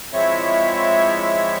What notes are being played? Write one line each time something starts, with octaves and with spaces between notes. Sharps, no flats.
F3 G#3 C4 E4 C#5 E5